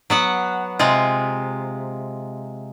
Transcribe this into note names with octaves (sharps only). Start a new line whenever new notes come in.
F#3 B3 F#5
C3 G#3 F4